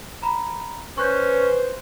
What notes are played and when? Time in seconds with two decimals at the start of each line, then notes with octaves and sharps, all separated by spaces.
0.23 A#5 B5
0.98 C#4 B4 C5 C#6 F#6 G6